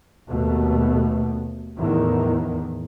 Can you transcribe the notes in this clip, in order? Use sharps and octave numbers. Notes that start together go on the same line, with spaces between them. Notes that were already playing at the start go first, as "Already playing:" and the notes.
D#2 B2 A3 B3
E2 A2 D#3